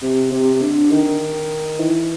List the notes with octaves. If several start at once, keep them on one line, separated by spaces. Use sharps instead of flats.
C3
C3
D3
D#3
E3